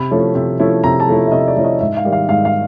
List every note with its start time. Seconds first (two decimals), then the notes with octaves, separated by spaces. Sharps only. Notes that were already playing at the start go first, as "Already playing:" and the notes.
Already playing: C3 B5
0.11 F3 A3 C#4 E4
0.35 C3
0.59 F3 A3 C#4 E4
0.84 C3 A#5
1.00 A5
1.08 F3 A3 C#4 E4
1.27 E5
1.32 C3 D#5
1.48 D5
1.56 F3 A3 C#4 E4
1.64 D#5
1.80 G#2 E5
1.97 F5
2.05 D#3 G3
2.12 F5
2.29 G#2 F5
2.45 F5